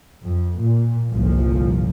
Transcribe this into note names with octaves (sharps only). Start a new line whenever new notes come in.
F2
A#2
G1 C2 A#2 F3